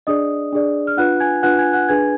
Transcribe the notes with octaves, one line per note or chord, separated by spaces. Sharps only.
D4 G#4 D5 D#5 D#6
D4 G#4 D5
F6
D4 F4 B4 F#5 F#6
G#5 G#6
D4 F4 B4 F#5 F#6
G#5 G#6
F#5 F#6
D4 G#4 B4 G#5 G#6